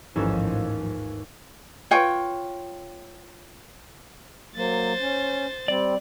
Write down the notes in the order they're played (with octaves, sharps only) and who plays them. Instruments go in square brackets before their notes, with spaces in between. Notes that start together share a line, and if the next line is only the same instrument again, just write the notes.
[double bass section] A1 F3 [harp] D#2 G#2 E7 [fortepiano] E3 C#4 A4
[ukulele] F4 B4 C#5 G5
[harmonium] F#3 A#3 [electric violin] C5 A6
[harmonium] C#4
[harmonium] G3 C4 [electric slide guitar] D5